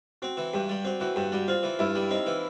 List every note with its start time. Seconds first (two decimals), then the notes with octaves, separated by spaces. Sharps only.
0.22 C4 F#4
0.37 E3
0.54 G2 G4
0.69 G3
0.85 C4 F#4
1.00 E3 F#4
1.16 G2 G4
1.32 G3 F#4
1.48 C4 F4
1.63 E3
1.79 G2 E4
1.95 G3
2.11 C4 D#4
2.26 E3